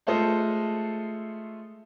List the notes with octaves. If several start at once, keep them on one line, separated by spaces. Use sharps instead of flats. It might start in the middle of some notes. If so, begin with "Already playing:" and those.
G#3 A3 F4 A4 C5 D#5